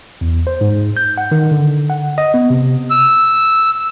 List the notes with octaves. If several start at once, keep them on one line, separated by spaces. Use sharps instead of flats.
E2
C5
G#2
G6
F#5
D#3
D3
F#5
D#5
B3
C3
E6